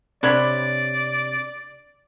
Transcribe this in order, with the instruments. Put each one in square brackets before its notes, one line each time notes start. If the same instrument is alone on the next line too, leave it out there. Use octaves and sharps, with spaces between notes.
[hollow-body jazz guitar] C3 [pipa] D4 C#5 B5 [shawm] D5